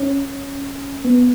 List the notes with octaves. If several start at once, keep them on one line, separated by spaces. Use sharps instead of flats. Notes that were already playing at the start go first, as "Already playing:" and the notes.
Already playing: C#4
B3